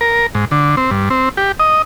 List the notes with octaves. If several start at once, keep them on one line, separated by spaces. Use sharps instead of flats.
A#4
G#2
D3
C4
G2
C4
G4
D#5